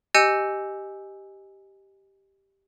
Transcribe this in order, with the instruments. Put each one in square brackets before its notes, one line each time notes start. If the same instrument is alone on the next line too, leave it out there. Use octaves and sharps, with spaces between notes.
[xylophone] G4 D#5 G#5 E6 G6 C#7